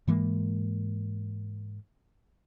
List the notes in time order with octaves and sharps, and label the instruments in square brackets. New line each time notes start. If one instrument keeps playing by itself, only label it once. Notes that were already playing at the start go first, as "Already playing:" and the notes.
[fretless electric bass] G#2 E3 G#3 A#3